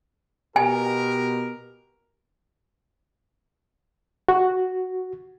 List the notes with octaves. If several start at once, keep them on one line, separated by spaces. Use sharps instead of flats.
B2 G4 A#4 G#5
F#4